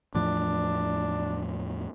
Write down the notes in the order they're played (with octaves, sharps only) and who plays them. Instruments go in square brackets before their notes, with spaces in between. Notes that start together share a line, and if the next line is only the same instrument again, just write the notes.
[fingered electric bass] E2 A2 F3 [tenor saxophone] D4